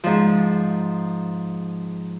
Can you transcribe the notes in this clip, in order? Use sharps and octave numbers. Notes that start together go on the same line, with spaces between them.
G#2 F3